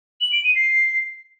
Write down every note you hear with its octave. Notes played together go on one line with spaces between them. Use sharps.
F#7
D7
D#7
C7